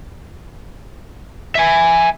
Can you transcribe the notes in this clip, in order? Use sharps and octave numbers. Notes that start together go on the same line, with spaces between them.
E5 G#5